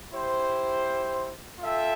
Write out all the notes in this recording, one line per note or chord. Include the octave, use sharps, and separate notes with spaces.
E4 G4 C5
F4 A4 E5 G5